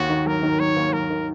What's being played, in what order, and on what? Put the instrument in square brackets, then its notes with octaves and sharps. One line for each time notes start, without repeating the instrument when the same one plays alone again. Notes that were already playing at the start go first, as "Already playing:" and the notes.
Already playing: [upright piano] D#2 [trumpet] F#4
[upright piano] D#3
[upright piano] F#3 [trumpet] A#4
[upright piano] D#3
[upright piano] F#3 [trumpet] C#5
[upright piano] D#2
[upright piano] F#3 [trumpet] A#4
[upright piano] D#3